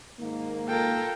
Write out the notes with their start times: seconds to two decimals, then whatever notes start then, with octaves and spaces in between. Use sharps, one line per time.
0.21 G#2 D#3 A#3
0.68 F4 A4 A#4 G5